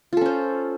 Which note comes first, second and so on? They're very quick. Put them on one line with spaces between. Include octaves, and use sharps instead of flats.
F4 A4 C#4 C5